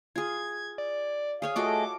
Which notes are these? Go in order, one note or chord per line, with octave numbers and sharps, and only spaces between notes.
F4 G#4 G#6
D5
G#4 C#5 F5 G#5
A3 F4 F#4 G#4 A4 D#5 D6